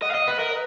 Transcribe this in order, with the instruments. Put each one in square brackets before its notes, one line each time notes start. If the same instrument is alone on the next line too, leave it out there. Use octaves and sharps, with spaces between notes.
[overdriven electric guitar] D#5 [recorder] F#5
[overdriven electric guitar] F5
D#5
[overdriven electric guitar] B4 [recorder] F#5
[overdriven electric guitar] A#4 [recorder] D#5
[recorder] B4